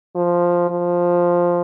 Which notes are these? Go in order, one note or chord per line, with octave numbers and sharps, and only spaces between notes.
F3
F3